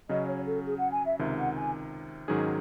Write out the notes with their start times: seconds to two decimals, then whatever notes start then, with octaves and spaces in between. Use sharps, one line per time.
0.09 C#3 F#3 C#4 D#5
0.27 C#5
0.46 A4
0.64 G#4
0.78 F#5
0.92 G#5
1.05 E5
1.19 C#2 C3 D#3 E5
1.37 F#5
1.55 G#5
2.28 G#2 D#3 F#3 C#4 G#4